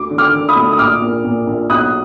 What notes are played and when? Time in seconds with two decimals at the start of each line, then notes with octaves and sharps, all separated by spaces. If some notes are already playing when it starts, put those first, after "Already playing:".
Already playing: D2 D6
0.11 D3
0.18 D6 F6
0.33 D3
0.49 B5 D#6
0.56 D2
0.72 D#6
0.79 A#1 D6 F6
1.02 A#2
1.24 A#2
1.47 A#1
1.70 B1 D#6 F#6